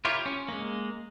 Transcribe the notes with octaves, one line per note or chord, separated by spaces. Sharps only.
E4 F4 G4 A#4 C#5
C#4
G#3 A#3